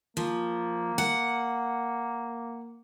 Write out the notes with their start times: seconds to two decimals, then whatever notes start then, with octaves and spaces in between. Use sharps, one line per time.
0.17 F3 A#3
0.98 F#5